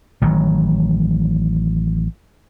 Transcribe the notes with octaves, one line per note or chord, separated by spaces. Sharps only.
A1 D#3 F#3